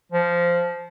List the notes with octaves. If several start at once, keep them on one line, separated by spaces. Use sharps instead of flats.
F3